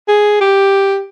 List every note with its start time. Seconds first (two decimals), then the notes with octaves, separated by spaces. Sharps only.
0.08 G#4
0.41 G4